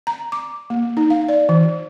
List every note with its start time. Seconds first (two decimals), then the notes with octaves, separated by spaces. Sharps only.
0.07 A#5
0.32 D6
0.70 A#3
0.97 D#4
1.10 F5
1.28 D5
1.49 E3